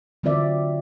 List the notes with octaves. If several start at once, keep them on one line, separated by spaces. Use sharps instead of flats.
D3 F#3 C4 F4 D5 E5